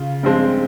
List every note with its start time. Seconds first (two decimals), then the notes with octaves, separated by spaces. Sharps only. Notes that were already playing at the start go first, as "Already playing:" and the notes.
Already playing: C#3 F4
0.23 G2 F3 G#3 C4